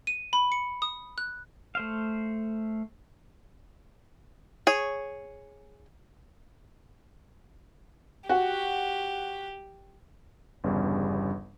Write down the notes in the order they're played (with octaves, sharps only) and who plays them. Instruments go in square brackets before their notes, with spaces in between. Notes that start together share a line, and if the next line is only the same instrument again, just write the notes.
[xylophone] D#7
B5
C#7
D#6
F#6
[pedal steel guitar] A3 C5 F5
[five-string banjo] G#4 C#5
[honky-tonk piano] F#4 [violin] G4
[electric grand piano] G1 E2 G2 C#3 G3